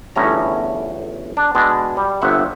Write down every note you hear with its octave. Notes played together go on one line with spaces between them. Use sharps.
G1 E2 A2 C#4 A#5
D4
B2 G#3 D4
G3
G1 C3 E5 F#5